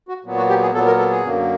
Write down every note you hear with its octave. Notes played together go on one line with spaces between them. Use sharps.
F#4
A#2 F#3 B3
F#4
G4
G#4
A#2 F#3 B3 A4
A#4
A4
G#4
F#2 D3 F#3 A#3